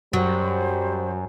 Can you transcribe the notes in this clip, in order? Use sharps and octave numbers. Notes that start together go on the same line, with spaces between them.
F#2 F#3 G3 C5